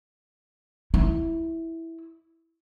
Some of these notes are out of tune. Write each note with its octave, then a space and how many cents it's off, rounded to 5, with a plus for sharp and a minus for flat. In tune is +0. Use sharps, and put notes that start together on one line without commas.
E4 -5